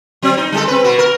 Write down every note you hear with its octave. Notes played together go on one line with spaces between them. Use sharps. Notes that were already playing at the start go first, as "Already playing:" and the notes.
F#3 C4
D#4
G3 G#3 A4
C4 B4
B2 F#4
A#4